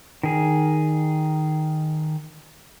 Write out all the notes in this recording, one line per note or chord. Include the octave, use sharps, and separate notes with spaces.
D#3 G#4